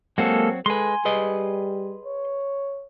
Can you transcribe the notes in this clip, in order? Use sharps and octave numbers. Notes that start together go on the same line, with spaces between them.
F#3 G#3 A#3 C4 F#4 A4
G#3 A4 B4 G#5 C6
G3 G#4 B4 D#5
C#5